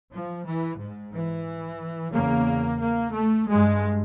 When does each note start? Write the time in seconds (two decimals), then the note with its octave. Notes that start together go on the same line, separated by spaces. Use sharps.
0.12 F3
0.44 E3
0.78 G#2
1.12 E3
2.13 E2 C#3 A#3
2.80 A#3
3.14 A3
3.47 G2 G#3